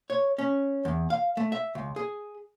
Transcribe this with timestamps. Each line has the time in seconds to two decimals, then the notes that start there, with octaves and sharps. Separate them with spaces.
0.10 C#5
0.38 C#4
0.85 E2
1.10 F5
1.37 A3
1.52 E5
1.75 C#2
1.96 G#4